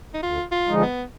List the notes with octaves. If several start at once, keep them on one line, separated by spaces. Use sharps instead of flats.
D#4
D2 F4
F4
D3 F3 G#3 D#4
B3